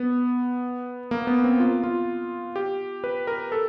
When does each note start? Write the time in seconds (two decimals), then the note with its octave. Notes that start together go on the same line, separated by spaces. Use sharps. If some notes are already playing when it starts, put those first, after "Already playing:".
Already playing: B3
1.11 A#3
1.27 B3
1.44 C4
1.60 F4
1.84 F4
2.56 G4
3.04 B4
3.27 A#4
3.52 A4